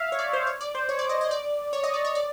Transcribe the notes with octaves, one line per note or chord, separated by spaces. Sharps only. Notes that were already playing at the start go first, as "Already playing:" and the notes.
Already playing: E5 F5
C#5
D5
C5
C#5
D5
C5
C#5
D5
D#5
D#5
D5
C#5
D#5
D5
C#5
D5